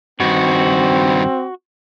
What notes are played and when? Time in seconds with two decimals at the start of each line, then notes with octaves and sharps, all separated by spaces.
0.20 G2 D#3 C4 F#4